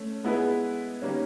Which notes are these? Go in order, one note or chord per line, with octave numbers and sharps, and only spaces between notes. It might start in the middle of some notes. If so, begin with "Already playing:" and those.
Already playing: A3 C#4
G#3 B3 E4 G#4 B4
D#3 G3 A#3 C#4